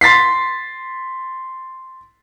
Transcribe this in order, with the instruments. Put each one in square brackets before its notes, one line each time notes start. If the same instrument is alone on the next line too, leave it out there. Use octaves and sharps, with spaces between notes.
[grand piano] C6 A6 B6 C7